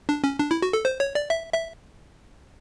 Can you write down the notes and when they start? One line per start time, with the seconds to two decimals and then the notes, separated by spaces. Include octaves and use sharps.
0.09 D4
0.24 C#4
0.39 D4
0.51 E4
0.62 F#4
0.73 A4
0.85 C5
1.00 C#5
1.15 D5
1.30 E5
1.54 E5